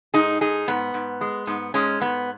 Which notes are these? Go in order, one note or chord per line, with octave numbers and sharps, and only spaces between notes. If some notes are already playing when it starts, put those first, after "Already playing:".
G#2 D#4 G#4
G#2 D#4 G#4
G#2 B3
G#2
G#3
G#2 B3
G#2 G#3 C#4
G#2 B3